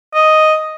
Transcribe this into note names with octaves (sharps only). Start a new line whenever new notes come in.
D#5